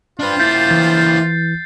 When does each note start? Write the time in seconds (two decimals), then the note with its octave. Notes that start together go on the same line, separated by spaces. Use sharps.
0.19 D4 F4 B4 C5
0.40 A#3 E4 G6 A6 C7
0.71 E3 A6